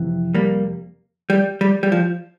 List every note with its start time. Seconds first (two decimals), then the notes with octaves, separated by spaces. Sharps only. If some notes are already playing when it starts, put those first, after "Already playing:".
Already playing: F2 C3 E3
0.34 G3 A#3
1.30 G3
1.61 G3
1.83 G3
1.92 F3